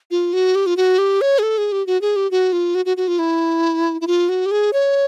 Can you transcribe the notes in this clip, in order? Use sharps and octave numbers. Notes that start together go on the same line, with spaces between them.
F4
F#4
G4
F4
F#4
G4
C#5
G#4
A4
G#4
G4
F#4
G#4
G4
F#4
F4
F#4
F#4
F#4
F4
E4
E4
F4
F#4
G4
G#4
C#5